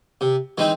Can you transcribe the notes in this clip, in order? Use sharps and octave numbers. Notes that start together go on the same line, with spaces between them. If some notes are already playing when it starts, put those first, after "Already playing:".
C3
E3 G#3 C4 D#4